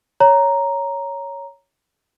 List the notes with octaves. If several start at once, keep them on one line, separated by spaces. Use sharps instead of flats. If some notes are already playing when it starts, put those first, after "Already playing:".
C#5 A#5